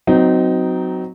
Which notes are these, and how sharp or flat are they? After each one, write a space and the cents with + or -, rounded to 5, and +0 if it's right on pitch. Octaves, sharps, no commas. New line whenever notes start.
F#3 +0 C4 -30 D#4 +0